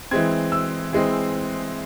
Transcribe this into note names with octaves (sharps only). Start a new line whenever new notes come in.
E3 G#3 C4 G#6
E6
E3 G#3 C4